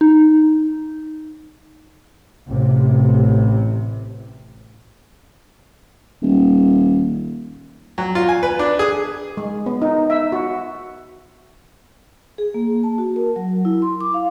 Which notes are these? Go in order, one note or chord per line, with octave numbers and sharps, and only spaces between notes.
D#4
A1 C3
D#1
F#3
F4
G#5
B4
D4
G#4
G#3
B3
D#4
E5
F#4
G#4
A#3
A5
F#4
A#4
F#3
E4
C6
D6
F5